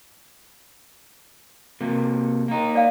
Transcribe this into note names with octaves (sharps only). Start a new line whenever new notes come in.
C3 A#3
A#3 D#4
D5 F5